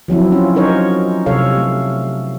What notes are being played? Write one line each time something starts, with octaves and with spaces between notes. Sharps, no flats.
F3 F#3 C4 E4
C#4 F4
C#4 D#4 A#4 C5 C#5
C3 A4 C#5 F5
A3